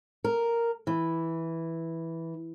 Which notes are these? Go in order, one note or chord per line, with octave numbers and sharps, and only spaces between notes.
A#4
E3